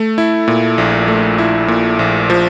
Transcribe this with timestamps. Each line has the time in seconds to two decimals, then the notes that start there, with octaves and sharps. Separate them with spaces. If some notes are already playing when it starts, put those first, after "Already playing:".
Already playing: A3
0.18 E4
0.48 A#2
0.78 A#1
1.08 A3
1.38 E4
1.68 A#2
1.99 A#1
2.30 F3